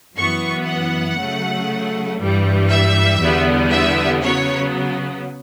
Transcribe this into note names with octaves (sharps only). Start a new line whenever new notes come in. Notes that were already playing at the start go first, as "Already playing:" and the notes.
F#2 E3 B3 C#6
F#5
C#3 F#3 A3
G2 E3 G3
E5
E2 D3 G3 B3
E5
C#3 F#3 B3 C#5